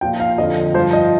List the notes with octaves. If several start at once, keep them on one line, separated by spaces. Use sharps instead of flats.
A#2 F3 G5
F5
F2 D3 F3 D#5
G2 F3 C5
D#5